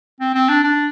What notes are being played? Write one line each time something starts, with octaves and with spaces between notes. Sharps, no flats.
C4
C4
D4
D4